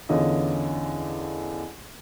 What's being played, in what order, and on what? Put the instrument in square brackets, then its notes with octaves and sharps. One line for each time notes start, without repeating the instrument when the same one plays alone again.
[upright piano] E2 D3 E3 C#4 F4 D#5